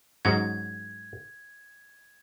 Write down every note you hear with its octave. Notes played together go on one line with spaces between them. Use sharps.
G#2 F#3 C#4 F#4 G#6